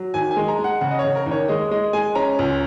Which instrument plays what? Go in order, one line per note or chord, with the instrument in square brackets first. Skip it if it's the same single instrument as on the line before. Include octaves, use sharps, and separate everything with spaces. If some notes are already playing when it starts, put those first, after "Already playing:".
Already playing: [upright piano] F#3
D#2 G#5
G#5
G#3
A#5
G#3
F#5
C#3 F#5
D#5
C#5
C#3
A#4
D#2
C#5
G#3 D#5
G#3 D#5
G#3 G#5
C#4 A#5
C#2